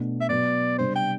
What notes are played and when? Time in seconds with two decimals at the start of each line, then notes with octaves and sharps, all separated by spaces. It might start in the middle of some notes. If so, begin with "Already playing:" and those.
Already playing: B2 A3 D4
0.21 E5
0.29 B2 F#3 B3 D5
0.78 C3 G3 D4 C5
0.96 G5